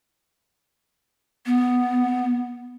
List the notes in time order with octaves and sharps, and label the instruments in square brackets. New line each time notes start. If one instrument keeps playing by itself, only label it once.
[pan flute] B3